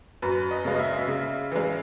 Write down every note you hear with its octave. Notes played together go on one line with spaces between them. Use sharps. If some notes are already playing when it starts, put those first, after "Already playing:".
F#2 B4
D#5
C#3 G#3
D#5
E5
C#3
E3 G#3